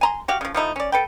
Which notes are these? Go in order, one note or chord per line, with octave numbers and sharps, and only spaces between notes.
G#5 A#5 C6
F#4 G4 F5
C#3 F3
F3 A3 D#4 E4
C#4 D5
A4 B4 G5